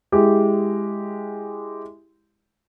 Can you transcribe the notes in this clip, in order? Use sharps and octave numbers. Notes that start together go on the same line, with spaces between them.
G#3 E4 G4